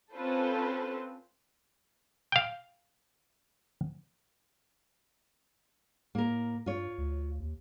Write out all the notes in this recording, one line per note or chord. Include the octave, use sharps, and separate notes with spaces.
C4 C#4 F4 A4 B4 C5
F5 G5
A2 A#3 A#4
G2 F4 C#5
D2
D#2